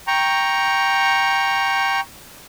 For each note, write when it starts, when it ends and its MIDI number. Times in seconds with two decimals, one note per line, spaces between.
0.07 2.00 79
0.07 2.00 82
0.07 2.00 85